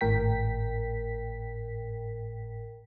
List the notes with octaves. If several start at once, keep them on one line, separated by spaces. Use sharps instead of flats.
G#1 A2 A#4 G5 B6